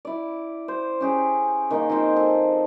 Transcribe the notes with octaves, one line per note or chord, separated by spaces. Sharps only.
E4 D5
C5
C#4 G4 G#4
D#3 A#3 D#5 G#5
D#3 F3 C4 C5
A4